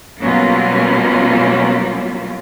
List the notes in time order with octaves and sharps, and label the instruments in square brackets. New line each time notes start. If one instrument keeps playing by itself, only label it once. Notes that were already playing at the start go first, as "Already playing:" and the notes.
[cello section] B2 F#3 G3 A#3 C#4 F4